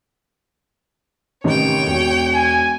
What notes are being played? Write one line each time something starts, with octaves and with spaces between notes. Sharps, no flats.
A1 C3 D#3 C#5 G5
E1
G#5